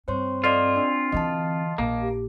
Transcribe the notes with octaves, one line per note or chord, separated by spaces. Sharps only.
G2 C4 C5 C#5 C6
F4 A4 D5 D#5
D4
D3 E3 D#5 A5
A#1 A#3
G4